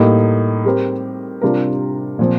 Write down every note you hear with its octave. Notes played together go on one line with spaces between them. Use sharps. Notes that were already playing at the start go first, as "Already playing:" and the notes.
Already playing: A2 G3 A#3 D#4
G3 C4 G4 A#4
C3 G3 D4 F4 A#4
A#2 F3 C4